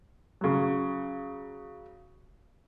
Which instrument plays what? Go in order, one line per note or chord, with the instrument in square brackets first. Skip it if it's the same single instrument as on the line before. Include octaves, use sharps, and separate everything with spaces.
[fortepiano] C#3 F#3